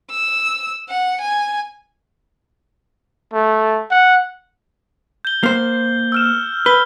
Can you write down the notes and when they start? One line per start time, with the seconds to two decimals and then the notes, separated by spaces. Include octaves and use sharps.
0.11 E6
0.89 F#5
1.21 G#5
3.33 A3
3.91 F#5
5.25 G6 G7
5.43 A#3 C5
6.12 E6 F6 E7
6.66 B4 G7